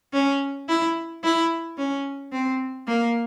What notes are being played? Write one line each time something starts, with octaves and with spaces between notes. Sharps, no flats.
C#4
E4
E4
C#4
C4
A#3